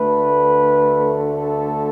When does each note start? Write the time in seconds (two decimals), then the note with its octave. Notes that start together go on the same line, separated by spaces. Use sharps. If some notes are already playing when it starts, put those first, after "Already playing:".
Already playing: D2 D3 A3 B4
1.33 A4